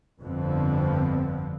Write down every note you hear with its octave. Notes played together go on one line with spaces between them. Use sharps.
G1 F2 D3 F3 B3 C4